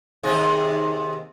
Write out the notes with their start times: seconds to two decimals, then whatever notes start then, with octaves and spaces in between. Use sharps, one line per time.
0.23 D#2 C3 G#4